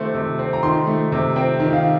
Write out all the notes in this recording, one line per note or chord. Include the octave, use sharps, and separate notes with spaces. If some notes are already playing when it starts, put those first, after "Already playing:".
Already playing: C3 D#3 A3 C4 C5
C3
C4
A#5
D#3 C6
A3
C3
C4 G5
D#3
F5